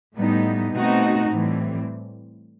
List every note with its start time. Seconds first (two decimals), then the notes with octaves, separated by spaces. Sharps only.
0.15 A2 G3 B3 D#4
0.73 B2 A3 C4 D#4 F#4
1.29 A2 E3 G3 C4